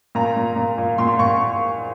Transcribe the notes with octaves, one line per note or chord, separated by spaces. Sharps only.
A#2 A#5
A#2
A#2
A#2
A#2 C6
A#2 C#6